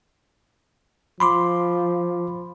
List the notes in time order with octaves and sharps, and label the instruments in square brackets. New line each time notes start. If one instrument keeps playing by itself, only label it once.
[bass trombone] F3 [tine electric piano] B5 C6 D6